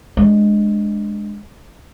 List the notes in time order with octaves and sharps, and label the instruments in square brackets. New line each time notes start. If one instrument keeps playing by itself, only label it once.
[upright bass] G#3 D4